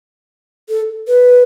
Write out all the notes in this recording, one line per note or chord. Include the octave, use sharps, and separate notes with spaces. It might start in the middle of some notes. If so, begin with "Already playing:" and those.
A4
B4